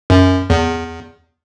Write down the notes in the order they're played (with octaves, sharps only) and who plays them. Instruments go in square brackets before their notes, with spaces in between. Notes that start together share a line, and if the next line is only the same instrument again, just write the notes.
[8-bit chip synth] F#2
E2